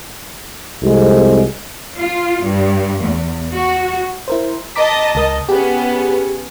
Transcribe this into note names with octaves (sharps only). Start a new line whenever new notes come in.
C2 F2 G#3
F4
G2
E2
F#4
E4 A#4 C5
D#5 A5 A#5 D6 B6
C#2 A#4 D#6
B3 C#4 G4 G#4